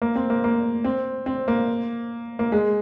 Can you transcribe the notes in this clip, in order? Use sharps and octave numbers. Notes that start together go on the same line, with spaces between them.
A#3
C4
A#3
A#3
C4
C4
A#3
A#3
G#3